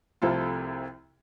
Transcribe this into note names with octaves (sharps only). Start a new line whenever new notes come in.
C2 C3 F3 A3 F4 A4